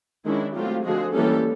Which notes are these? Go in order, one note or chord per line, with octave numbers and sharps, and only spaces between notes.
D#3 G#3 C#4 D4 E4
F#3 A3 C4 F4 G4
D3 F3 G#3 F#4 G#4
E3 G3 A#3 C#4 G4 A4